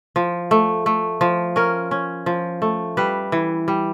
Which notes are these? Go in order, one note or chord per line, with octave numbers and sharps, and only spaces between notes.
F3
A3
A3
F3
C#4 A#4
C#4
F3
A3
G3 B4
E3
G3